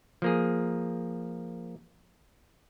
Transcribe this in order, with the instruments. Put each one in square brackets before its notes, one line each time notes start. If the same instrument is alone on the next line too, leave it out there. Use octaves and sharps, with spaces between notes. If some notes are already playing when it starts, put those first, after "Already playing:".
[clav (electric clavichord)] F3 A#3 G#4